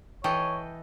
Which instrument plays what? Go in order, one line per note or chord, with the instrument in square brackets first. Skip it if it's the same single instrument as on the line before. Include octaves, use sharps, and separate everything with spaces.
[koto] E3 A4 D#5 [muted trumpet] C#5 [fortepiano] G5